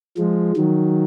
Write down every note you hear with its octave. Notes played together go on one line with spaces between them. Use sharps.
F3 G#3
D#3 F#3